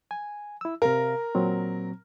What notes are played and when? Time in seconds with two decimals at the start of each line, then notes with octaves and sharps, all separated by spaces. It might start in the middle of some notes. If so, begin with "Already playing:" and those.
0.11 G#5
0.61 E4 E6
0.82 C3 A#4 F5
1.35 A#2 F#3 C4